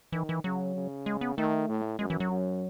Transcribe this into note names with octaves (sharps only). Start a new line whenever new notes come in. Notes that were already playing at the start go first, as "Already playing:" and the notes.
D#3 E3
E3
C#3 F#3
C#3
G#3
B3
D#3 A3
A2
F#2 G#3
E3
F#3
F#2